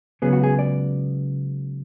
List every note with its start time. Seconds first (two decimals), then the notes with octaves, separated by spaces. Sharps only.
0.22 C#2 C#3 F#3 B3 G#4
0.33 F#4
0.43 G#4
0.59 D5